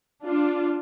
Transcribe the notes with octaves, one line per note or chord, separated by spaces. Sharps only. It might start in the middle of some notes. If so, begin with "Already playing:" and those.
D4 F4